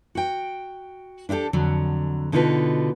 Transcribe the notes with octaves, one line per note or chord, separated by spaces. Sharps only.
F#4 G5
D4 E4 F#4 G4 A4
F2 D3 F#3
B2 D3 D#4 F4 F#4 B4